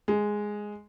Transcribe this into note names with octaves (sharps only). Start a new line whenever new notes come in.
G#3